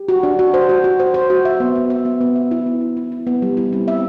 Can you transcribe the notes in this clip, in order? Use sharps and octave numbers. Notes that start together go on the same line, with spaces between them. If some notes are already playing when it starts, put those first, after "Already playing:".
Already playing: G4
F#4
D4
F#4
C5
F#4
F#4
C5
C5
F#4
E5
B3
B3
E5
B3
B3
E5
E4
B3
E4
E4
E4
B3
G3
E4
C4
E5